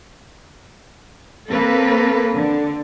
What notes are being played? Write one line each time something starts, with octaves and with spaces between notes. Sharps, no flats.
A#3 C4 A4 B4
D3